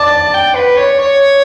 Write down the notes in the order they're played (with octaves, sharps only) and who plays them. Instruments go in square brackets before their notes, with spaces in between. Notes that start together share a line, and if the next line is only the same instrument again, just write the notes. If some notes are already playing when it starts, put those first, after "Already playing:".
Already playing: [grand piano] D5 [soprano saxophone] A5
[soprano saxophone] G5
B4
C#5
C#5